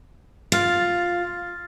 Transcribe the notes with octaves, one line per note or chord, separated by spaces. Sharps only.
F4 F6 A6